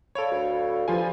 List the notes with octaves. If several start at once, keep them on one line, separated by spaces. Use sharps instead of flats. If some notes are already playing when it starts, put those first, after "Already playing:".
A4 C#5 D5 F5 B5
D2
G2 F3 F4 G#5